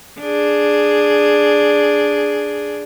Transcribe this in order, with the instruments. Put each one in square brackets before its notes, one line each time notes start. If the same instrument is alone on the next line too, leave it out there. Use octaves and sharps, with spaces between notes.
[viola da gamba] D4 G#4